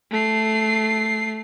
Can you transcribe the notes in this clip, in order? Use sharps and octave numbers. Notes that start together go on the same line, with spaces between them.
A3 C7